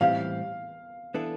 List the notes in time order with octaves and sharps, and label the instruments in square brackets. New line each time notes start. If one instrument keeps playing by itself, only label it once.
[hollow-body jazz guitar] A2 E3 G3 C4 G4 [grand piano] F5
[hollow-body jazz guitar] E3 B3 D4 A4